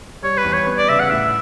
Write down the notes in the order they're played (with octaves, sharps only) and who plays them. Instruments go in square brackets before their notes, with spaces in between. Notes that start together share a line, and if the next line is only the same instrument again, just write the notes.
[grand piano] G3 [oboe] C#5
[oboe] B4
[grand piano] E2
[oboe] C#5
[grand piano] B3
[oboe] D5
[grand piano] C#3 [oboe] E5
[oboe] F#5
[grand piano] A2 [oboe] E5